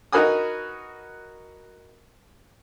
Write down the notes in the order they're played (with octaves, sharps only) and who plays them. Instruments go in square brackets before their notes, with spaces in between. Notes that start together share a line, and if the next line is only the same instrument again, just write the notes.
[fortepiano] D#4 F#4 A#4 B4 G#5 D#6